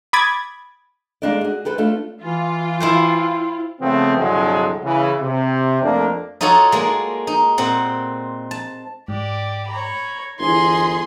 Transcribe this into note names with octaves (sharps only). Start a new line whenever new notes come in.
B5 D6 D#6 G#6 A6
G#3 A#3 C4 D4 A4 D5
F#4 G#4
G4 A4 B4 C5
A3 C#4 D4 F4 A4
E3 F4
E4 C5 G5
C#3 F3 A3 B3 C4
C2 G2 D3 F3 F#3 G#3
C#3 E3
C3
F2 A3 A#3 D4
D#4 F4 F#4 A4 C#5
G#3 A#3 D5
D#4
A#2 C4 F#5
A5
G#2 G4 D5
C#5 A#5 B5
G1 E3 D#4 G#4 C6 G#6